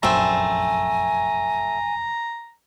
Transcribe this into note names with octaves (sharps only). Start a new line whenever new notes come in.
F1 A#1 F#2 A3 C4 G5 G#5 A#5